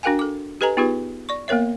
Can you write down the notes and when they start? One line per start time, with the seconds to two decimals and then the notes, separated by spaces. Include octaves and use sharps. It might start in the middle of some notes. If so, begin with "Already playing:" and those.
0.03 D4 F#4 A#4 F5 G5 G#5
0.19 A4 D6
0.61 G4 A4 B4 D#5 G#5 A#5
0.77 B3 D#4 F4 G4 G#4 B4
1.29 D5 C#6
1.48 A#3 B3 A#4 C#5 E5